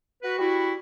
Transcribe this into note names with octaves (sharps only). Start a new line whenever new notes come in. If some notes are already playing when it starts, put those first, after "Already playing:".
F#4 B4
G3 E4 F#4